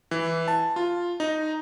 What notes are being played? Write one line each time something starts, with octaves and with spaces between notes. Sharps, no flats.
E3
A5
F4
D#4